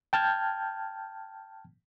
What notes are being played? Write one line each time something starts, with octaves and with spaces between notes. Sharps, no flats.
G5 A5 F6 G6 G#6